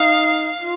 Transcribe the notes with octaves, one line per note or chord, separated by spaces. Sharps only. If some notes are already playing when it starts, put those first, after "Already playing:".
Already playing: D#4 F5
F4